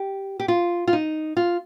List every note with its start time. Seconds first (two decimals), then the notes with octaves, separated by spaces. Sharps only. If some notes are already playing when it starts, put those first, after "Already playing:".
Already playing: G4
0.40 G4
0.48 F4
0.88 F4
0.93 D#4
1.37 F4